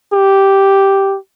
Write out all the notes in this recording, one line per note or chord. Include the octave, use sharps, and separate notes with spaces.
G4